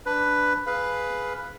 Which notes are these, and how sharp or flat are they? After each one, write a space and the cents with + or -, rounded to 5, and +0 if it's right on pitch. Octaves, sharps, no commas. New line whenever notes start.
D4 +0 B4 +5
G#4 +10 B4 +0 F5 +0